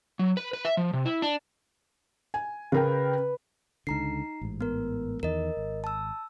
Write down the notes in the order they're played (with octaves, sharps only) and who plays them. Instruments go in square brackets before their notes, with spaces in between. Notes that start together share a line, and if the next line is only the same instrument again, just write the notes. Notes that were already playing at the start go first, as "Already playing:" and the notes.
[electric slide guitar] F#3
B4
B4
E5
F3
C3
E4
D4
[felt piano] G#5
[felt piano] C#3 A#4 G5 [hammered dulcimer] B4
[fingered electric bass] C#2 D3 [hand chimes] D#4 A#5 C7
[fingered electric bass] A1 G#2
[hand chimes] B3 A#4
[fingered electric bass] E2 D#3 [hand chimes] A#4 D#5
[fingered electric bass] G#1
[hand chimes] A5 E6